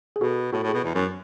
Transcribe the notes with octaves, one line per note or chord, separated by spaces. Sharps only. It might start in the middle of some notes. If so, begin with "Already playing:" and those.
G#4
B2 F#4 A4
A2 F#4 A4
A2
G#4
B2
E2
F#2